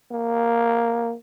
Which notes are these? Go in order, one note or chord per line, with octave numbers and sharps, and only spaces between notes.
A#3